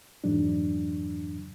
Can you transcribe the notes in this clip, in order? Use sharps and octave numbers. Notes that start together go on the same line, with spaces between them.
F2 G#2 E3 F#3 D4